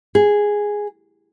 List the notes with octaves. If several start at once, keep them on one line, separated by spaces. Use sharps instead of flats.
G#4